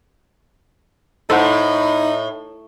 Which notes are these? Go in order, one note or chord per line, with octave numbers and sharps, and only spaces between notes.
A2 D#4 A4 C5 F#5